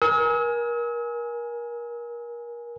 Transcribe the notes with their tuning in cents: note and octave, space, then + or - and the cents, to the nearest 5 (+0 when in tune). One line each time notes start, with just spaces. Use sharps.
A#4 +30 G#5 +5 E6 -45